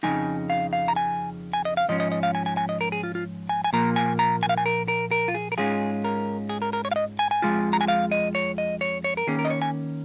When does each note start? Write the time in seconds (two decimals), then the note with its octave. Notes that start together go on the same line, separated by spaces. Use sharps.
0.03 F2 C#3 F3 G#3 D#4 G#5
0.50 F5
0.73 F5
0.88 A#5
0.96 G#5
1.53 G#5
1.65 D#5
1.77 F5
1.88 G#2 F3 C#4 D#5
2.00 D#5
2.12 D#5
2.23 F5
2.35 G#5
2.46 G#5
2.57 G#5
2.69 D#5
2.81 A#4
2.92 G#4
3.03 F4
3.15 F4
3.49 G#5
3.64 G#5
3.73 A#2 F3 A#3 A#5
3.96 G#5
4.19 A#5
4.43 G#5
4.49 F5
4.58 G#5
4.66 A#4
4.88 A#4
5.11 A#4
5.28 F4
5.35 G#4
5.52 A#4
5.58 G#2 G#3 C#4 F4 G#4
6.04 A#4
6.49 G#4
6.62 A#4
6.73 A#4
6.85 C#5
6.91 F5
6.96 D#5
7.19 G#5
7.31 G#5
7.42 F2 F3 G#3 F4
7.73 A#5
7.81 G#5
7.88 F5
8.11 D#5
8.35 C#5
8.58 D#5
8.81 C#5
9.04 C#5
9.17 A#4
9.27 D#3 A#3 C#4 G#4
9.39 A#4
9.45 D#5
9.50 C#5
9.62 G#5